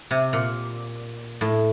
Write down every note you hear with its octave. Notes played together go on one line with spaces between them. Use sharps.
C3
A#2
A2